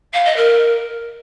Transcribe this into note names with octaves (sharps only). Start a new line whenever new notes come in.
F5
D#5
A#4